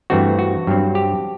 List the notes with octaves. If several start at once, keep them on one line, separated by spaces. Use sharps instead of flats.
G2 E3 A3 C4 F#4
F#4
G2 F#3 C4
G4